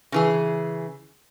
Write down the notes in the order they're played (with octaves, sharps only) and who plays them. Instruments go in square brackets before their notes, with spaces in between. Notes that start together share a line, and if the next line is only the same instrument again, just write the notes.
[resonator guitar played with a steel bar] C#3 E3 G#4